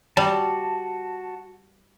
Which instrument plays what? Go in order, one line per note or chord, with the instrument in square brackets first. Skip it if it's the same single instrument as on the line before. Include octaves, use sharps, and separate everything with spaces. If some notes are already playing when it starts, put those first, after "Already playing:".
[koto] G3 [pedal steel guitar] F#4 A5